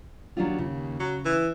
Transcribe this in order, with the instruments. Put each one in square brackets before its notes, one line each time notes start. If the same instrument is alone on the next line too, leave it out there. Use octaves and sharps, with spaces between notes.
[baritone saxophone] D#2 [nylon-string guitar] F#3 D4 F4
[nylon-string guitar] C#3
[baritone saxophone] F#3
E3